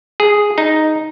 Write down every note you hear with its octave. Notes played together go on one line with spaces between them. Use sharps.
G#4
D#4